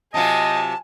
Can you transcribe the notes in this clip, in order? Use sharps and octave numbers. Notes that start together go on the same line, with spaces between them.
C3 F#3 F4 D#5 G#5 A5